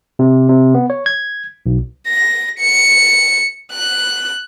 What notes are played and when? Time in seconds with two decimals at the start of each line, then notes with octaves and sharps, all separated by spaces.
0.19 C3
0.49 C3
0.75 B3
0.90 C#5
1.06 G#6
1.66 B1
2.07 A#6
2.59 C#7
3.73 F#6